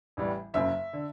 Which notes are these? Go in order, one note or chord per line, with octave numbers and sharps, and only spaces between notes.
A1 A2 E3 G3
F#1 F#2 C#3 E5
D3